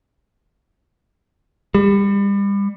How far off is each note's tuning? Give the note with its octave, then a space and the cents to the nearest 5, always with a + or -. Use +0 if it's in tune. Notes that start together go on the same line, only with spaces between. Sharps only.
G3 +35